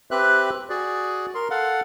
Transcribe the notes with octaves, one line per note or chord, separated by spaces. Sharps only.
C4 G4 B4 E5 F#6
F#4 G#4 D5
A#4 C6
A4 F5 F#5